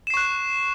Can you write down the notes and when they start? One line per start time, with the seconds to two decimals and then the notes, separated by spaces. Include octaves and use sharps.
0.07 E7
0.10 C7
0.14 C#6
0.17 F#6